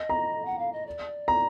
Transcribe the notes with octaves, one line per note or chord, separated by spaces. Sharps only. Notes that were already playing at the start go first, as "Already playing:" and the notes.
Already playing: D#5
A#5
F#5
F5
D#5
D5
A#5